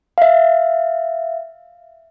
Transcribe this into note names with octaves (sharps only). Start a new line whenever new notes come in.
E5 F5